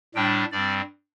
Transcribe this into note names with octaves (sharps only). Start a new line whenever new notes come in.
A2 G3 D4 G5
G2 G3 C4 D5